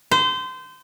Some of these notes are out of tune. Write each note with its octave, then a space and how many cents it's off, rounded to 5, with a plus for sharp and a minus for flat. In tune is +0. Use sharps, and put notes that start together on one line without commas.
C5 -25